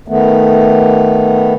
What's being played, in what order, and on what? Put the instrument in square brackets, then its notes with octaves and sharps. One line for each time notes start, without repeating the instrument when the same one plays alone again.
[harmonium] D#3 A3 B3